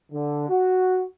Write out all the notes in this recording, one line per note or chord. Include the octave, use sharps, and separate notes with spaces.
D3
F#4